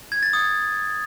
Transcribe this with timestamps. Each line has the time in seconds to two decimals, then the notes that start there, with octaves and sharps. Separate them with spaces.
0.12 G#6
0.23 A6
0.33 D#6